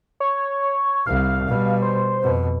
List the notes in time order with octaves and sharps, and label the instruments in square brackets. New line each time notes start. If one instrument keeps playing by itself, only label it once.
[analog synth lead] C#5
[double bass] C2 [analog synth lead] F5
[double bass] B2 G3
[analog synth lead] C5
[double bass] F2 B2